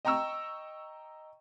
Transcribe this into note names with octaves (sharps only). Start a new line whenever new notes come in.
D#5 G5 A#5 C#6 E6